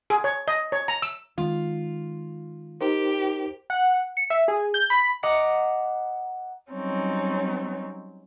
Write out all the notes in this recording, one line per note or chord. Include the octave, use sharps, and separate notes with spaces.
G#4
C#5
D#5
C#5
A#5
E6
D#3 G#3 F4
D#4 G4 A#4 C5
F#5
C#7
E5
G#4
G6
B5
D#5 F#5 A#5 D6 C#7
F#3 G3 C4 C#4 D#4